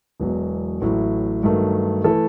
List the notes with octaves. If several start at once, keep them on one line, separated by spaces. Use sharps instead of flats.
E1 E2 B2 F#3
A1 A2 F#3
G2 D#3 F#3 A3
E3 A3 E4 A4